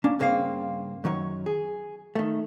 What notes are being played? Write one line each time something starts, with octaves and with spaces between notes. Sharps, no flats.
A#3 C#4 D4
G2 C#3 A#3 C4 E4 F5
F#2 D#3 F#3 C#5
G#4
D#3 A3